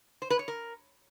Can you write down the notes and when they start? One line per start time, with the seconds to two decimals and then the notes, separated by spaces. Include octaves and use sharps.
0.22 C5
0.30 B4
0.39 C#5
0.48 A#4